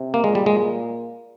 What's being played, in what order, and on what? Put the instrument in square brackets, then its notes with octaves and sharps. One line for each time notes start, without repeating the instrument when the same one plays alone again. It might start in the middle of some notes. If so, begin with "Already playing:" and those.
Already playing: [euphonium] C3
[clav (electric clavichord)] A#3
[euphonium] A#2 [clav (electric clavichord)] G#3
[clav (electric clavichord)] G3
G#3